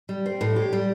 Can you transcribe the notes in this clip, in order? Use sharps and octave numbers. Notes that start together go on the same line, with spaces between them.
G3
C4
A2
G4
G3